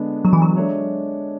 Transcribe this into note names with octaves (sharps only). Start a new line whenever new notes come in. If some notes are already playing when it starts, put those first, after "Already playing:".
Already playing: D3 G#3 B3 D4
F#3
E3
F#3
G#3 D4 A4 C#5 E5